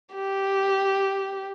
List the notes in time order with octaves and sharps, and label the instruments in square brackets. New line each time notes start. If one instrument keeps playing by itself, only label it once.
[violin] G4